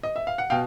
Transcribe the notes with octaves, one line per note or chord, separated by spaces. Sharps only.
D#5
E5
F5
F#5
B2 F5 G5